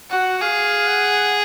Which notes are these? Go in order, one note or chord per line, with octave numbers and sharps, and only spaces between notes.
F#4 F#5
G#4 F5
F#5